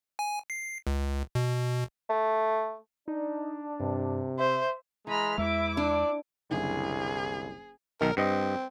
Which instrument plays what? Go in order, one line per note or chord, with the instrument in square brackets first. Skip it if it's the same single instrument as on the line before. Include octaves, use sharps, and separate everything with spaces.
[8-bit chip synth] G#5
C7
C#2
B2
[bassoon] A3
[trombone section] D4 [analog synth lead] D#4
[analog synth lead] G2 [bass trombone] C3
[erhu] C5 [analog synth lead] E5
[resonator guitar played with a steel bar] E3 [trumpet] G#3 [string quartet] A#5 B5 F6
[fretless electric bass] E2 G#3 [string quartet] E4 D6 [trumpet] E5
[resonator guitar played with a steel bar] D4 [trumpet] D5
[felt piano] F#1 D3 E4 [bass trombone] C2 [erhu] G#4
[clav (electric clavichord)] B1 D#3 [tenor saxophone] A#4
[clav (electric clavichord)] G2 D#5 [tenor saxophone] C4